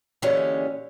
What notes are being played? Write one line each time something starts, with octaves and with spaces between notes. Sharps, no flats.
A#2 D3 E3 G#3 C#4 G4